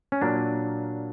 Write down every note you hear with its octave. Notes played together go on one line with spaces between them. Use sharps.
C#4
A#2 F#3 A#3 D4